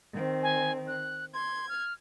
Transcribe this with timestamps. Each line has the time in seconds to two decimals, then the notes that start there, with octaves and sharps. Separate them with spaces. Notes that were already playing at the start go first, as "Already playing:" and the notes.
0.12 D#3 C4
0.43 G#5
0.88 F#6
1.34 C6 G#6
1.69 F6